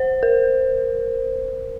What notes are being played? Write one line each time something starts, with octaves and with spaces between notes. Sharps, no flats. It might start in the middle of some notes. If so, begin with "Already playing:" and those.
Already playing: C5
A#4